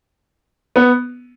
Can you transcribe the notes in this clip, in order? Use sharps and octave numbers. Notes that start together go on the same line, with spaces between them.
B3